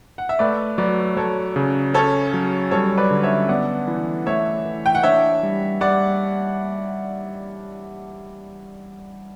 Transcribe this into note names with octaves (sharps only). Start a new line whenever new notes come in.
F#5
E5
A3 B4 D5
F#3 B4 D5
F#3 A4 C#5
C#3
C#4 A4 C#5
F#3
G3 A4 C#5
B4 D5
D3
C#5 E5
B3 D5 F#5
E3
A3 C#5 E5
E3
G5
F#5
D4 C#5 E5
G3
G3 D5 F#5